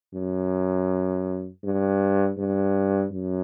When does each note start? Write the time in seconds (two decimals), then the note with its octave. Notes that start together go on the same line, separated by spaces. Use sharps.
0.14 F#2
1.64 G2
2.38 G2
3.12 F#2